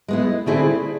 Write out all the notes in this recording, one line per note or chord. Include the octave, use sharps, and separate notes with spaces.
G#3 B3 E4
D3 A3 C4 E4 G#4